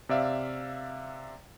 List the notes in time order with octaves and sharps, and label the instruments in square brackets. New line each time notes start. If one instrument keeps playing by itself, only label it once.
[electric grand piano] C3 D5 E5 F5